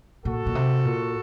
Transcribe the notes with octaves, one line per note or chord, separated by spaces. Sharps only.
A#2 F#4 A4
A#2
C3
A#2